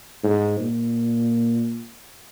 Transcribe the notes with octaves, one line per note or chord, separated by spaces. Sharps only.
G#2
A#2